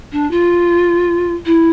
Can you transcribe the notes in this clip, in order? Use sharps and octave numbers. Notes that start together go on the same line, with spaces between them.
D4
F4
E4